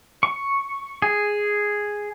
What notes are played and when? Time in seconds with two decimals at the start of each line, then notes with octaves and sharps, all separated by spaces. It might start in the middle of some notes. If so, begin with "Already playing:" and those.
0.23 C#6
1.02 G#4